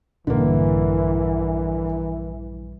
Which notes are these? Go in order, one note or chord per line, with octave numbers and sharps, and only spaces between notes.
A#1 G2 D3 E3 A#3